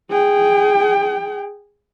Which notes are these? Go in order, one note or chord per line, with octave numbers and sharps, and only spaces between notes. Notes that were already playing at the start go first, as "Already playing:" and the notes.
G#4 G5